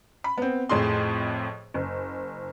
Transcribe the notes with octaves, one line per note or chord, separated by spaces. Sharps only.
B5
B3 C4
F2 A2 G#4 C6
F#1